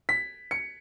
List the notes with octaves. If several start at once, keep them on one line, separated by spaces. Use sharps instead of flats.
B6
C#7